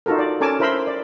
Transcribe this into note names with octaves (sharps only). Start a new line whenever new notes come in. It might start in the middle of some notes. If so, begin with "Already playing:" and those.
D#4 F4 F#4 A4 A#4
D5
C#4 A4 A#4 G#5 A5 D6
E4 A#4 C5 B5 C6 E6
D5